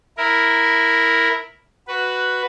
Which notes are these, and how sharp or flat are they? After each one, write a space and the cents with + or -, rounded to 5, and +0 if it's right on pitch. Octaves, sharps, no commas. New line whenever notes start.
E4 -5 A#4 +0
F#4 +0 B4 +0